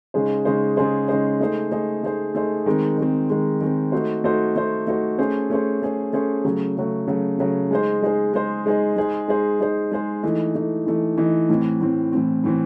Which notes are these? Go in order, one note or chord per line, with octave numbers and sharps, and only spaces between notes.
C#3 G#3 D#4 G#4 C5
C#3 G#3 D#4 G#4 C5
C#3 G#3 D#4 G#4 C5
C#3 G#3 D#4 G#4 C5
A3 D#4 G#4 C5
A3 D#4 G#4 C5
A3 D#4 G#4 C5
A3 D#4 G#4 C5
D#3 G#3 C4
D#3 G#3 C4
D#3 G#3 C4
D#3 G#3 C4
A3 D#4 F#4 C5
A3 D#4 F#4 C5
A3 D#4 F#4 C5
A3 D#4 F#4 C5
A3 C#4 G#4 C5
A3 C#4 G#4 C5
A3 C#4 G#4 C5
A3 C#4 G#4 C5
C#3 F#3 A3
C#3 F#3 A3
C#3 F#3 A3
C#3 F#3 A3
G#3 D#4 G#4 C5
G#3 D#4 G#4 C5
G#3 D#4 G#4 C5
G#3 D#4 G#4 C5
G#3 D#4 G#4 C5
G#3 D#4 G#4 C5
G#3 D#4 G#4 C5
G#3 D#4 G#4 C5
E3 A3 D#4
E3 A3 D#4
E3 A3 D#4
E3 A3 D#4
A2 E3 C4
A2 E3 C4
A2 E3 C4
A2 E3 C4